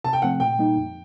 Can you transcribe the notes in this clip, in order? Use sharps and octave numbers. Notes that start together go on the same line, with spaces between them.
C3 A5
G5
F3 A3 C4 F#5
A#2 G5
G3 A#3 D#4
F2